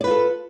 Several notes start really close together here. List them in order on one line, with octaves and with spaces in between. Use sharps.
D5 B4 F4 A4